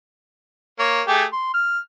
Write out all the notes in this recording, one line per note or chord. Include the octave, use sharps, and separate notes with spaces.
A#3 C#5
A3 G4 G#4
C6
F6